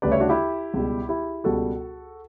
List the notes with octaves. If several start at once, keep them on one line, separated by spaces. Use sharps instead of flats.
D2 C#3 G3 B4 D5
C#5 E5
D4 F#4
E4 G4
C#2 B2 G3
E4 G4
C#2 B2 G3 F#4 A4